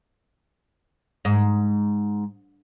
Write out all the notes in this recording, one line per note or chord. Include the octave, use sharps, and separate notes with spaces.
G#2